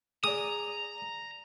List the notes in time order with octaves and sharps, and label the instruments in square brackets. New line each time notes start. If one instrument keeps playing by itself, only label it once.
[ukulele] G#4 D5 [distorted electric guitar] A#5 [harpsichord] D#6